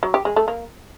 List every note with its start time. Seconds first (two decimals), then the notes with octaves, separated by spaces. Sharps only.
0.03 F#3
0.14 G4
0.25 G#3
0.36 A3
0.48 A#3